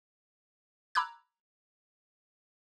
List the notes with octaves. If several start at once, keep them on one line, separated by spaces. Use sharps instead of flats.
A#5 B5 D6 E6 F#6 G#6